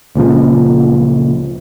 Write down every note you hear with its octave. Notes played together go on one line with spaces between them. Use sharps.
C#2 A#2 C#3 F3